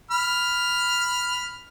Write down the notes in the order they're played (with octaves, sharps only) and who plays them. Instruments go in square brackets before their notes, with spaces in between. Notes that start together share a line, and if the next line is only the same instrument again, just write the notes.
[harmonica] B5 F6